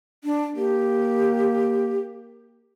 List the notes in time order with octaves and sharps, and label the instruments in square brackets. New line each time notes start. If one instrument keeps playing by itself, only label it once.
[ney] D4
[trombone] A#3 [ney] G4